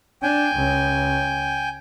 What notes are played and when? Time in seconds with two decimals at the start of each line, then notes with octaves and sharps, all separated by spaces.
0.22 D4 G5 G#5
0.56 C#2